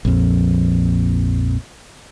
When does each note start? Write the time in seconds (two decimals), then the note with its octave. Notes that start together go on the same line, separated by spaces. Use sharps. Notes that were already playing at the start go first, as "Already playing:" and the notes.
0.05 A#1 F2